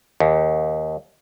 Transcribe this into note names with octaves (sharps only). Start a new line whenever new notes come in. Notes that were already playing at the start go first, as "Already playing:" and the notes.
D#2